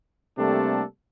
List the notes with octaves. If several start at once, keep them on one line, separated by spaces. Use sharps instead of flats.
C3 G3 A3 A#3 D4 A4